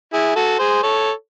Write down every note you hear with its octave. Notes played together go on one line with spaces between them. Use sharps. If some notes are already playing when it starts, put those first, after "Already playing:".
E4 G#4
F#4 A4
G#4 C5
A4 C#5